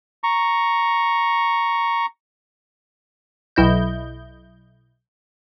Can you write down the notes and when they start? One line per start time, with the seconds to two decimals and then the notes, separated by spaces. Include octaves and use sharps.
0.24 A#5 C#6
3.56 B1 E4 D#5 G6